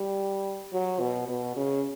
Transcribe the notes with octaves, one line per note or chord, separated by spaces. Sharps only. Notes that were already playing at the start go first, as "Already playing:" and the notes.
Already playing: G3
F#3
B2
B2
C#3